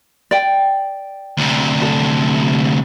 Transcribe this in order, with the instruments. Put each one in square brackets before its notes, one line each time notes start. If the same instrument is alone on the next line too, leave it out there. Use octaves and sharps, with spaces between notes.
[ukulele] D5 G5
[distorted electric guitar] D2 C3
[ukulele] A4